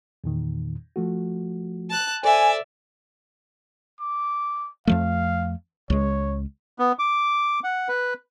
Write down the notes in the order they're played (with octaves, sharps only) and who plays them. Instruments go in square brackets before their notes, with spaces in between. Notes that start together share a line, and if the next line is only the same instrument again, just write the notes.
[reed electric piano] E2 A#2 D#3
F3 A3 F#4
[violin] A5 F#6
[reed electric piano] A4 C5 [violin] D5 E5 [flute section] G#5
[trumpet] D6
[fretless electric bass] F2 F3 A3 [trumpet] F5
[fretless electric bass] C#2 G#3 [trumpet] C#5
[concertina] B3
D6
F#5
B4